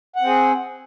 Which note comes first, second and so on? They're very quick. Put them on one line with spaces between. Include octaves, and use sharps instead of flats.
F#5 C4 G#4